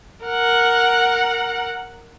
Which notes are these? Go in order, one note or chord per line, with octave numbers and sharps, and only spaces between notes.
A#4 F#5